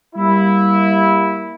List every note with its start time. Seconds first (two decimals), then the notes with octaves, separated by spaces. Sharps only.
0.16 G3 A#3 E4